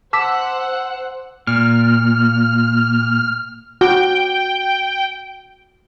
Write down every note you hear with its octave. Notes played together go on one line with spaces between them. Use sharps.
C5 F#5 A5 D6 E6 F#6 B6
A#2 F6
F#4 G5